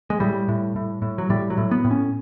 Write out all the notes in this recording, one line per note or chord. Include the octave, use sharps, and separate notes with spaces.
G#3
A2 G3
A2
A2
A2
F#3
A2 G3
F#3
A2
B3
A2
C#4